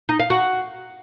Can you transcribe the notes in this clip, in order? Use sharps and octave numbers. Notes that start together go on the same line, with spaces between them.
D#4
F5
F#4